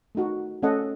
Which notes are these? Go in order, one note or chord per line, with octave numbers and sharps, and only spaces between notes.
A3 D#4 F#4
A3 C#4 A4 D#5 F#5